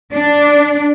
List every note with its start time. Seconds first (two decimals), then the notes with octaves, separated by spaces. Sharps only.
0.13 D4